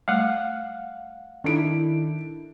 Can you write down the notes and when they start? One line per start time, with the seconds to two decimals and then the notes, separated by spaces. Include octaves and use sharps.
0.08 G3 A3 F5 F#5
1.44 D#3 D4 E4 A4 D7